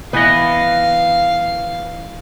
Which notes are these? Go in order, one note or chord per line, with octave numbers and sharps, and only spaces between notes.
E3 B3 B4 D#5 F5